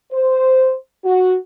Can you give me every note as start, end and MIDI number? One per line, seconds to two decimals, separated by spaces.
0.12 0.74 72
1.04 1.35 66